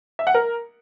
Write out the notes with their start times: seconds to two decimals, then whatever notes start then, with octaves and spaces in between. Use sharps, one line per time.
0.19 E5
0.27 F#5
0.34 A#4